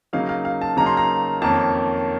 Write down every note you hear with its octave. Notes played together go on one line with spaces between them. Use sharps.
C#3 F#3 A#3 D#4 F5
F5
F5
A5
C#3 F#3 A#3 D#4 A#5
C6
A#5
F2 D#3 A#3 C#4 A5